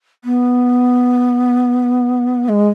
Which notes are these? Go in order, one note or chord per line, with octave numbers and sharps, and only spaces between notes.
B3
G#3